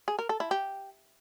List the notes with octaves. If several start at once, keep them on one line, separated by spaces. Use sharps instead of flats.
G#4
A#4
A4
E4
G4